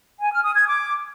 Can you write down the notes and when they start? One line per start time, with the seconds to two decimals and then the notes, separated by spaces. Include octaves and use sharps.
0.21 G#5
0.32 F6
0.44 D#6
0.55 G#6
0.66 D6